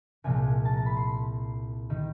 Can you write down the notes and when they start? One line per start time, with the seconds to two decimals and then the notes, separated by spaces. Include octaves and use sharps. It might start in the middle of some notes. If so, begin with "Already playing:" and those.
0.24 C2 A#2 F3 G#3 G#5
0.65 A5
0.76 A#5
0.86 B5
0.96 C6
1.90 D#3 G3